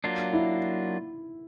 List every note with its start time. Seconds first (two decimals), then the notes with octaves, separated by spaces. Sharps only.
0.04 F#3 A#3 D4 F4
0.33 E4